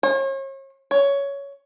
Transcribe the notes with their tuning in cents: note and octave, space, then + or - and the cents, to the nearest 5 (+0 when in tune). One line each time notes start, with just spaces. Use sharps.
C#5 -40
C#5 +10